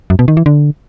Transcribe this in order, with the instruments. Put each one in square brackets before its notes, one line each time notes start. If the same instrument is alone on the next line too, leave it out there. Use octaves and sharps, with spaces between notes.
[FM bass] F#2
B2
D#3
E3
D3